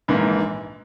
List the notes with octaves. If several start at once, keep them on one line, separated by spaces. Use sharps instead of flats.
A#1 G#2 E3 A#3